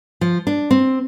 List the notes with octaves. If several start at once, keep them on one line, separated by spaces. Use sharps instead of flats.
F3
D4
C4